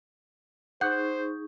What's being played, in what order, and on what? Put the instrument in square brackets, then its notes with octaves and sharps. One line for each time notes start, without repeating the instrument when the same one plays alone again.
[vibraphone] D#4 G#4 C#6 [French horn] C5 [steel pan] F#5 [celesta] G6